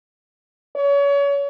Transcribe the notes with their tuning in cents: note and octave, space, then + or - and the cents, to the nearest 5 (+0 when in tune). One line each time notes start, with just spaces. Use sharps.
C#5 +30